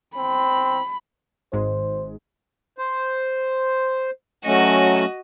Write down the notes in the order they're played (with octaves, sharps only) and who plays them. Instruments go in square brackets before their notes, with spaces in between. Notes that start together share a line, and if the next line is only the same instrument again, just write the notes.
[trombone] C4 [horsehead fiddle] B5
[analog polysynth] G#1 G#2 G#3 [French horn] C5
[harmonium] C5
[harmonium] F#3 A3 C#4 [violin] F#4 D#5